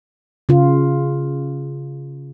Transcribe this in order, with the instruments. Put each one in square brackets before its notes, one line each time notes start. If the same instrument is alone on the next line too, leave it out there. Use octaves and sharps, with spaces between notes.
[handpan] C#3 F4